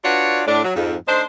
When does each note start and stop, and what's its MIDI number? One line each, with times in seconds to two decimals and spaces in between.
0.04 0.43 62
0.04 0.43 65
0.04 0.43 66
0.04 0.43 71
0.04 0.43 73
0.04 0.43 74
0.47 0.63 45
0.47 0.63 62
0.64 0.75 54
0.75 0.95 41
0.75 0.95 44
1.08 1.24 57
1.08 1.24 62
1.08 1.24 63
1.08 1.24 72